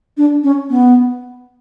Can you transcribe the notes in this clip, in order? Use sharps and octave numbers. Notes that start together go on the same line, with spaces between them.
D4
C#4
B3